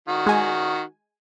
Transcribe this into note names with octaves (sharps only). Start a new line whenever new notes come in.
D#3 F#4
G#3 G#5